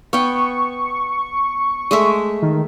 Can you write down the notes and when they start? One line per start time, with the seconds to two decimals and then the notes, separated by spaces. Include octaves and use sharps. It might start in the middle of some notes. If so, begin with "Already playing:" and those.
0.13 B3 G5 C#6
1.91 G#3 A3 E5
2.42 D#3